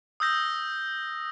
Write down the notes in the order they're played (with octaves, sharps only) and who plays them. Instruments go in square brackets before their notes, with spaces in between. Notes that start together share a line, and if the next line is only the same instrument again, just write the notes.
[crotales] D#6 E6 G6 A#6